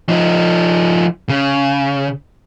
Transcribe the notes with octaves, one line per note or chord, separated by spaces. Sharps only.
F3 D#4
C#3